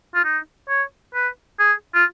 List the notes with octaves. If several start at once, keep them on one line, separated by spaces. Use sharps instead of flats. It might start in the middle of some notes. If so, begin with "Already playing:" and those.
F4
D#4
C#5
B4
G#4
F4